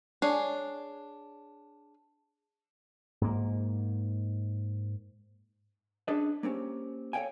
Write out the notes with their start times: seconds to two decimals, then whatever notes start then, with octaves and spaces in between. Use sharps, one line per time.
0.22 D4 G#4 C#5 G#5
3.21 G#2 A#3
6.08 C#4 D4 G#4 A4 B4 D#5
6.43 A#3 C4 C#4 G4
7.13 A4 C#5 D5 F5 G5 G#5